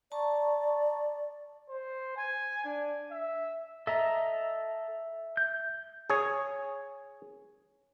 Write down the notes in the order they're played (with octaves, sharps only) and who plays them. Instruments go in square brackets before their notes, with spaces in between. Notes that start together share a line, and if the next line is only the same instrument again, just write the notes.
[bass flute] D5 [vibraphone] A5 A#5 C#6
[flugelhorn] C5
G#5
D4
E5
[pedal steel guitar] A4 D#5 A#5 [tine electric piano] E5
[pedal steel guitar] G6
[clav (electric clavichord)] G#4 C#5